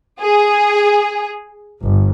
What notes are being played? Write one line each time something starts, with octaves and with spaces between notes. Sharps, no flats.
G#4
G1